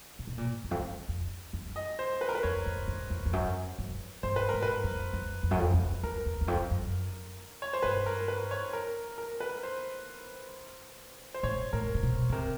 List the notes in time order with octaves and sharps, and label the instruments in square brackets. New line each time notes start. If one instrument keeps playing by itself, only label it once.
[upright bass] A#2
B2
A#2
E2
F2
E2
F2
F#2
[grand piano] D#5
C5
B4
A#4
B4
[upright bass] F2 [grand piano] C#5
[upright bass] F2
F2
F2
F2
F#2
F#2
[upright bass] G2 [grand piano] C5
[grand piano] B4
[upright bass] G#2 [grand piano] A#4
[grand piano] B4
[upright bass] F#2
F#2
F2
F#2
F2
F2
[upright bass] E2 [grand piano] A#4
[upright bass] E2
E2
F2
F#2
[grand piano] C#5
C5
[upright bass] G2 [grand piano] B4
[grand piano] A#4
B4
C#5
A#4
A#4
B4
C5
C5
[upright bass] A2 [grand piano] C#5
[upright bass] A2 [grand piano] A#4
[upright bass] C3
B2
C#3
[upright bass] C3 [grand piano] A#4